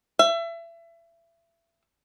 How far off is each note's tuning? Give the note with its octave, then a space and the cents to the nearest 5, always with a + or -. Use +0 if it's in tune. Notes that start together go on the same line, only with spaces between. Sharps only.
E5 +30